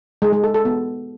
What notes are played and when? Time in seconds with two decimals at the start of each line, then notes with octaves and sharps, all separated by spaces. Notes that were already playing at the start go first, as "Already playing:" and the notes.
0.22 G#3
0.33 G#3
0.44 A4
0.54 A4
0.65 B3